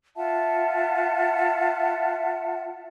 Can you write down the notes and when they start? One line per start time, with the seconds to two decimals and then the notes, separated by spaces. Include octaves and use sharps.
0.16 F4 E5 F#5 A5